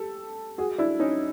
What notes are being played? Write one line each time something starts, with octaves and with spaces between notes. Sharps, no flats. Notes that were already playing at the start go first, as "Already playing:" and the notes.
Already playing: G4 A4
F#4 G#4
D4 E4
C#4 D#4